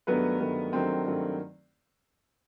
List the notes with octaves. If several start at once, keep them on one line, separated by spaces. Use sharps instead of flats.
G2 D#3 F#3 A3 B3 B4
G2 D#3 F#3 A3
G2 D#3 F#3 A3 C4 C5
G2 D#3 F#3 A3